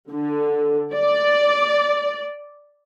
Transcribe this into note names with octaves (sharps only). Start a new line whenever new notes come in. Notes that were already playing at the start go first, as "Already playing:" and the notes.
D3
D5